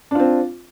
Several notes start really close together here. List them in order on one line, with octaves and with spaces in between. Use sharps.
D4 F4 C4